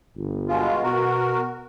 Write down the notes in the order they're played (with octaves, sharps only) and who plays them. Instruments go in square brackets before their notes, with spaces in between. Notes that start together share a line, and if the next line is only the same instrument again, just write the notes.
[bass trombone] G1
[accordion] B2 G#3 F4
[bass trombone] B2 [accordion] F#4 A#4